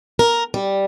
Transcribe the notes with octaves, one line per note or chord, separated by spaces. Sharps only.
A#4
G3